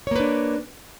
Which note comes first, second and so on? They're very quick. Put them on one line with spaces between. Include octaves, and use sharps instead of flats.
C#5 A#3 B4 D4